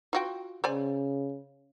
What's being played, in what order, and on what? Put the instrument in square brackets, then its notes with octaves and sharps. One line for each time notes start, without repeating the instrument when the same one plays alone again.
[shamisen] F4 F#4 G5
[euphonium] C#3 [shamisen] C5 D5 G#5